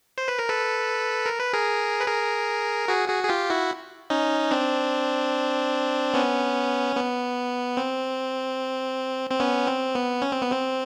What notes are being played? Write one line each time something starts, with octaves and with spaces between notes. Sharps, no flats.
C5
B4
A#4
A4 B4
A#4
B4
G#4 A#4
B4
G#4 A#4
F#4 G#4
F#4 G#4
G#4
F4 G4
E4 F#4
C#4 D#4
C4 D4
B3 C#4
B3
C4
C4
B3 C#4
C4
B3
C#4
C4
B3
C4